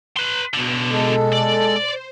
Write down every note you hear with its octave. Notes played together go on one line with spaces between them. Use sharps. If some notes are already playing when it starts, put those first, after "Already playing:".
B4 C6
C#2 B2 D3
G#3 A4
D5
C5